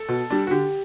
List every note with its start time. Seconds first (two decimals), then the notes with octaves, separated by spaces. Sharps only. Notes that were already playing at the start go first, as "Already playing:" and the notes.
Already playing: A4
0.09 B2
0.30 G3 D4
0.47 F#4
0.51 D3 G4